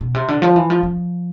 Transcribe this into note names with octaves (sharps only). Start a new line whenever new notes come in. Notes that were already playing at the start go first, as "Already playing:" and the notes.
B2
C3
D3
F3
E3
F3
F3